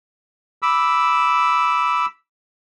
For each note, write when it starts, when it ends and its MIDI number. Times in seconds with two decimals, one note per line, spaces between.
0.62 2.06 83
0.62 2.06 86
0.62 2.06 88